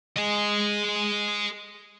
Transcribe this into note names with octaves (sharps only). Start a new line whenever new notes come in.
G#4 D#5